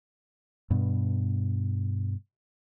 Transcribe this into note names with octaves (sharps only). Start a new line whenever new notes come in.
G2 B2